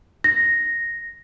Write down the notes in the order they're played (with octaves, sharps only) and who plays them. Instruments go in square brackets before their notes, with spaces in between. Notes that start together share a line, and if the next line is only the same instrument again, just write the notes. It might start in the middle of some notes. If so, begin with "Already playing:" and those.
[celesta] A#6